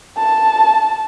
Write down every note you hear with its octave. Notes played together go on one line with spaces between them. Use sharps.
A5